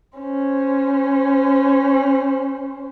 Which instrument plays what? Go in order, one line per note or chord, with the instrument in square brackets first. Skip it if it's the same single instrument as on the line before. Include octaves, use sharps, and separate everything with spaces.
[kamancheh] C#4 C5